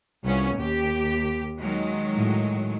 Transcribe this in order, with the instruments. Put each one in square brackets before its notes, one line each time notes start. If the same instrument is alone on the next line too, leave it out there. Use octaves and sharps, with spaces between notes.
[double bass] C2 [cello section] B3 C#4 F4
[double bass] D#2 [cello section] G4
[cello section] D#3 F#3 G#3
[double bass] A2